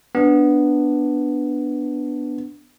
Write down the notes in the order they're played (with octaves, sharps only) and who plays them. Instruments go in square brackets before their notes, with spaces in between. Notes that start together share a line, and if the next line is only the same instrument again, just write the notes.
[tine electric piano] B3 [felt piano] D4